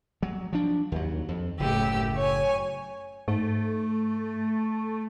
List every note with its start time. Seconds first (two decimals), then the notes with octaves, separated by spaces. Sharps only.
0.23 F#3
0.53 F3 D4
0.92 D#2 F#3
1.29 F2
1.60 F#1 A2 C#3 G4 E6
2.17 C#5 G#5
3.28 G#2 A3